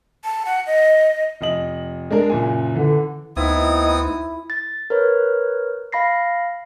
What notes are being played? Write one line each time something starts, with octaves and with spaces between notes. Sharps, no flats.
A5
F#5
D#5
F1 D#5 F#7
G#3 D4 A#4
F#1 A#2 G#5
D3 E3
D2 B3 C4 D#4 E4 D#6
A6
A#4 B4 C#5
F5 B5 A#6 C7